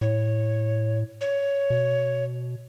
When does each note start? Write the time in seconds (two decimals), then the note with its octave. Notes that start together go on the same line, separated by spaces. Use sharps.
0.01 A2 C#5
1.21 C#5
1.70 B2